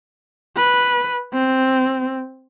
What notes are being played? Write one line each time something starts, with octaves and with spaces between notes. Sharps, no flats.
B4
C4